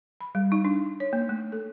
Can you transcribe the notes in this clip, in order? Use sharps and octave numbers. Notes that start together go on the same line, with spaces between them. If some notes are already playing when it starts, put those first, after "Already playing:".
B5
G3
D#4
D4
C#5
A#3
A3
A4